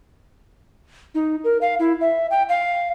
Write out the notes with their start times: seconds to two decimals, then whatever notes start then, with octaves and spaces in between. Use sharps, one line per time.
1.15 D#4
1.44 A#4
1.61 F5
1.79 E4
2.01 E5
2.31 G5
2.49 F5